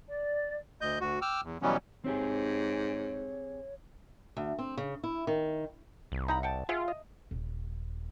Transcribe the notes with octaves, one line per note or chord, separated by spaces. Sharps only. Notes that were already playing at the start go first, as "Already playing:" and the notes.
D5
D2 D#5 G6
D2 F#4
G5 D6 E6 F6
E2
B2 E3 F#3 G3 B3 C#4
G#2 C4 G4 G#4 C#5
D2
C4
C#3
E4
D#3
C2
D#4 A#5 B5
F#5 G5 A5
F4 G#4 E5 F#5
D#5
D#1